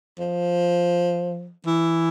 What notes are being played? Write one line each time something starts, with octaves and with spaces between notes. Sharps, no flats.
F3
E3